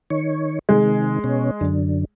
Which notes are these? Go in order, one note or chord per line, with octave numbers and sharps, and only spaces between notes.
D#3 C#5
C3 D#3 G#3
B2 C#4
F#2 D3